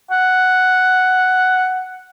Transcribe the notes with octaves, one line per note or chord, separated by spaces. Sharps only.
F#5